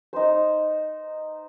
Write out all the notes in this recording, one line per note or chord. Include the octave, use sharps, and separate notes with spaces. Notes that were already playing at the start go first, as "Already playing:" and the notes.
D#4 C5